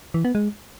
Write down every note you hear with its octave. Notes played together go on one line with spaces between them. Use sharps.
E3
B3
G#3